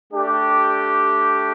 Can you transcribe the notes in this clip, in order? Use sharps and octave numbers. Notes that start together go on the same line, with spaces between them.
A3 D4 G4